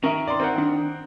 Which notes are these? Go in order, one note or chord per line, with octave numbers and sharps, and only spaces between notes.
D#3 C#4 A#4 E5
D5 C6
C4 A#4 F#5
D4